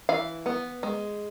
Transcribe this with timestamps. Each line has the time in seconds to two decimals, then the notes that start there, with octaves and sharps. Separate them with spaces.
0.09 E3 F5
0.46 B3
0.83 G#3